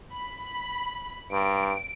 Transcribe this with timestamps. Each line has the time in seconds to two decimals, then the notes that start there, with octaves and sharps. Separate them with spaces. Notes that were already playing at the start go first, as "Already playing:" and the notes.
0.12 B5
1.32 G2 D7